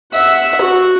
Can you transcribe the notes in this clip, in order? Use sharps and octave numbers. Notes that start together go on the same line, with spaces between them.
E5 F#5
F#4